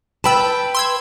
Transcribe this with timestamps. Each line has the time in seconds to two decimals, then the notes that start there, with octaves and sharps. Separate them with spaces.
0.24 B4 G5 A5 B5 E6
0.75 C6 E6 G#6